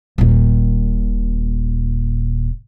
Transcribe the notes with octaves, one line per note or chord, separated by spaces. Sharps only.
D#1 A#2